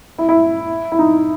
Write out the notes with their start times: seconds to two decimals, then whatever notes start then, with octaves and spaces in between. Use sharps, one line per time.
0.18 E4
0.29 E4
0.92 E4
0.99 D#4